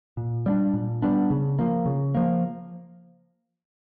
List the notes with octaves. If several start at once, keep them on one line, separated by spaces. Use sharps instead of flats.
A#2
G3 B3 D4
A#2
G3 B3 D4
C#3
F3 A#3
C#3
F3 A#3